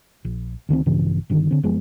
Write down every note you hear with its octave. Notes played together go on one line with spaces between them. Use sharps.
A#1
D2 D#3 A#3 C4
A#1 G2 C#3 E3
G1 D3 D#3
D3 C4
F#1 F3 G#3 B3